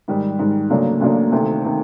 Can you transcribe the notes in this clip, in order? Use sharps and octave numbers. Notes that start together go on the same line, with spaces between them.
G#2 D#3 G3
G#2 D#3 G3
D2 C#3 F#3 A#3 D4
D2 C#3 F#3 A#3 D4
D2 C3 D#3
C3 D#3